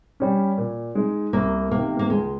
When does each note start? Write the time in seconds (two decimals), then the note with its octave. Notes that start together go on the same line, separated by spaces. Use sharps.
0.20 G3 C#4
0.58 A#2
0.95 G#3 D#4
1.33 C2 A#3
1.71 C3 D#3 A#3
1.99 A#3
2.09 C#2 G#3